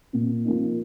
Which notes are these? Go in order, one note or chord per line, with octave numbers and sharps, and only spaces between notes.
A#2
F3 A#3 D#4